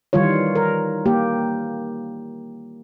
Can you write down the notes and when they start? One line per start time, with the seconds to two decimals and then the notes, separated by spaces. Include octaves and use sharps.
0.13 D#3 E3 G3 F4 C#5
0.55 A#4
1.06 A#3 G4